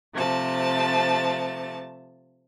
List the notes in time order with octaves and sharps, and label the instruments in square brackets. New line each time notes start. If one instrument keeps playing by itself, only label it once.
[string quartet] C3 F3 A3 A5